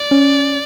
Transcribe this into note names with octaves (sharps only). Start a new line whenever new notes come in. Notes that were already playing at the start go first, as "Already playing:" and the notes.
Already playing: D5
C#4